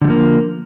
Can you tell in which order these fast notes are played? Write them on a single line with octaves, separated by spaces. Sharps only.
D3 G3 F3 A#3